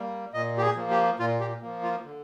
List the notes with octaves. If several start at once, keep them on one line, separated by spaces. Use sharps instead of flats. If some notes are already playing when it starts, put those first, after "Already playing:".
Already playing: G3 A#3
A#2 D#5
G4
G#4
F3 A#3
G4
A#2 F4
G4
F3 A#3
F4
D3